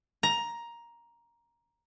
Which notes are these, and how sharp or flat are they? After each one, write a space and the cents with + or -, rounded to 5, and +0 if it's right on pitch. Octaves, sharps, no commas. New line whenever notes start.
A#5 +10